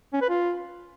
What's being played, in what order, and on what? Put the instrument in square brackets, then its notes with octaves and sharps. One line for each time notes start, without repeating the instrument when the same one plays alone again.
[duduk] C#4
B4
F4